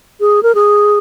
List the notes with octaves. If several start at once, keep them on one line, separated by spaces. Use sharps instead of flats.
G#4
A#4
G#4